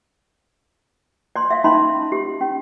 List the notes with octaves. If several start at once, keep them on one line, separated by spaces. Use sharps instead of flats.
D5 C6
E5 F5
C#4 D#4 D#5 A5 B5 C6
G4
C#4